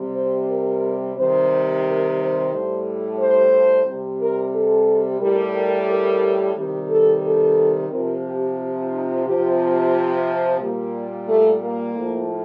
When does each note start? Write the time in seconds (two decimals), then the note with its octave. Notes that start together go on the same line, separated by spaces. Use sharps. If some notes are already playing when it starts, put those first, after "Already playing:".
Already playing: C3 G3
0.14 C5
0.48 A#4
1.15 C3 D#3 G3 C5
1.83 A#4
2.16 C5
2.50 A2 G3
3.17 C5
3.86 C3 G3
4.19 A#4
4.53 A4
5.20 A2 G3 A#4
5.54 A#4
5.88 A#4
6.54 C3 D#3 G3 G4
6.89 A4
7.23 A4
7.89 C3 A#4
7.94 F3
8.23 G4
8.91 D#4
9.25 C3 F3 G4
10.58 A#2 G3 A#3
11.27 A3
11.60 A#3
11.94 A2
11.99 F3